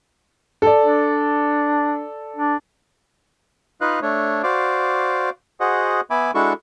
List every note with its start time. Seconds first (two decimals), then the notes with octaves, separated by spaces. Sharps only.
0.62 A4 D5
0.83 D4
2.37 D4
3.81 D#4 F4 B4 D#5 F5 F#6
4.02 A3 D4 C#5
4.43 F#4 C5 D5 F5 D6
5.60 F#4 G#4 C5 D#5 F#5
6.10 B3 E5 G#5 B5 D6
6.35 G#3 D4 E4 F#4 A4 C#6